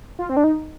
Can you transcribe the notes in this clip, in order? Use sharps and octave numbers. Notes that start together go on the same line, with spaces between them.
F4
C4
D4
D#4